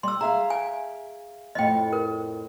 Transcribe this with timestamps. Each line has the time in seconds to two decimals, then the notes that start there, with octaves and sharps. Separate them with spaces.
0.03 G3 C6 E6
0.21 G#4 E5 F5 A#5
0.50 G#5
1.55 F2 A2 D#5 G5
1.93 A#4